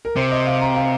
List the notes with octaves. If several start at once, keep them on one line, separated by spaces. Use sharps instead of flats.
A#4
C3 C5
D#5
F5
A#5
F5